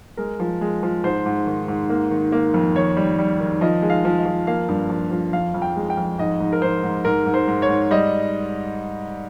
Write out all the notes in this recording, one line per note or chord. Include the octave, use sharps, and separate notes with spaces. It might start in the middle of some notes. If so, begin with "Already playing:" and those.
G#3 A#4
F3
G#3
F3
G#2 C5
G#2
D#3
G#2
A#3
D#3
A#3
F2
D#3 C#5
G3
G3
D#3
F3 D#5
G#3
F5
F3
D#5
F3
A#3 F5
G2
F3
F3
F2 F5
F2
G5
G#3
G5
F2
G#2 D#5
G#2
A#4
G#2 C5
G#2
G#2 A#4
G#2
C5
G#2
C#5
G#2
G3 D#5